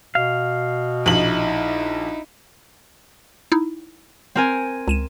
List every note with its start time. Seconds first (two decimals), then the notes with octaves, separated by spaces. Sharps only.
0.15 B2 F5
1.06 A#1 D#4 E4 F#7
3.52 D#4 E4
4.35 C4 A#4 G#5
4.88 C#2 D#7 E7